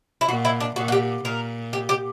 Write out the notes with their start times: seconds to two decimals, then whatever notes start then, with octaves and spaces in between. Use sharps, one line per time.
0.21 E4
0.28 A#2 F#4
0.45 E4
0.60 D4
0.76 A#2 F#4
0.88 F#4
0.92 G4
1.24 A#2 A#4
1.73 G4
1.89 G4